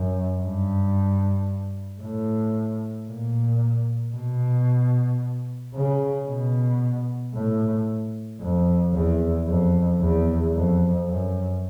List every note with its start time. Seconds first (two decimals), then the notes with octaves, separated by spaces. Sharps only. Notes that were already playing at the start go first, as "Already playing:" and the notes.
Already playing: F#2
0.42 G2
2.01 A2
3.07 A#2
4.14 B2
5.74 C#3
6.27 B2
7.34 A2
8.40 F2
8.93 E2
9.47 F2
10.00 E2
10.53 F2
11.07 F#2